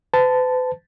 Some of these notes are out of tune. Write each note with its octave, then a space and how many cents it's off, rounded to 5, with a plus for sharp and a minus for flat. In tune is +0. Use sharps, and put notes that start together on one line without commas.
B4 +45 A5 +0